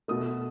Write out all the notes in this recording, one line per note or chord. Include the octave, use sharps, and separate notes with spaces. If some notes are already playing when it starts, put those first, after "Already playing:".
B2 A3 D#6